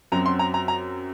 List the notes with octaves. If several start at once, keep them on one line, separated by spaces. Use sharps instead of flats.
F#2 F#3 C4 A#5
C6
A#5
A#5
A#5